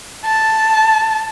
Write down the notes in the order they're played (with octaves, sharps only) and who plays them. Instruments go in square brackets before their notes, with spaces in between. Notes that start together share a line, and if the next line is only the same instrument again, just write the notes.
[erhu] A5